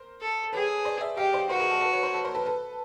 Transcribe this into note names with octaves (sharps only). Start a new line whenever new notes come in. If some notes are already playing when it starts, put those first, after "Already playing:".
Already playing: A#4 C5
A4
G#4 B4 C#5
C5 D5
D5 E5
G4 D#5 F5
C5 D5
F#4 A#4 C5
B4
G#4 A#4
A4
A4 B4
B4 C#5
A#4 C5
A4 B4
A#4 C5
A4 B4
A4 B4